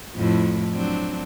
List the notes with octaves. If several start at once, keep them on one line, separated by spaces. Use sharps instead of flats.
F2 A2 E4
F#3 C4 D4